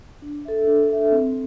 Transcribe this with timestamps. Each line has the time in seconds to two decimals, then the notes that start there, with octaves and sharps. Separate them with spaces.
0.22 D4
0.45 A4 E5
0.67 D4
0.90 A4 E5
1.12 C4